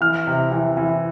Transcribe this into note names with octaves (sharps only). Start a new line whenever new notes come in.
E3 F6
C3
E3
E3